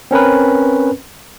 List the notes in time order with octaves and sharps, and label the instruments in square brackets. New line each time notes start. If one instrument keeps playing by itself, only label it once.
[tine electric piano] C4 C#4 A#4 B4